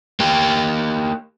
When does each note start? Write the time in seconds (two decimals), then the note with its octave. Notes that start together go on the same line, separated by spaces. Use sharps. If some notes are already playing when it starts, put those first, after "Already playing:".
0.20 A#3 G4